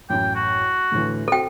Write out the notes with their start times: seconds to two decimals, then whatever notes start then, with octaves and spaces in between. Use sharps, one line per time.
0.10 A1 F#2 G5
0.35 F#4
0.92 D2 A2 E3
1.28 C4 F#4 A4 G5